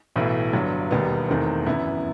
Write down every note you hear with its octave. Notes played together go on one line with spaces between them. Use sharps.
B1 A2 E3 A3
G1 G2 F#3
E1 D#2 D#3 G3 B3
E1 E2 D#3 A3 C4
G1 F#2 E3 B3 E4